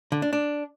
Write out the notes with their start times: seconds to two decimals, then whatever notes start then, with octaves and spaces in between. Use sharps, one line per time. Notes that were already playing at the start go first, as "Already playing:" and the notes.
0.12 D3
0.22 D4
0.33 D4